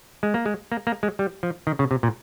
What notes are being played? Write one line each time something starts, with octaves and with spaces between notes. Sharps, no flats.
G#3
A#3
G#3
A#3
A#3
G#3
G3
F3
D#3
C#3
C3
A#2